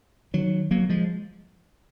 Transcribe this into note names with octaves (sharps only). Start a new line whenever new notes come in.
D#3 F#3
F#3 A#3
F3 G#3